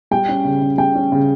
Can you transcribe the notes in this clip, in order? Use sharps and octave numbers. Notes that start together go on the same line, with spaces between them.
G3 G5
C#4
C#3
C#3
G3 G5
C#4
C#3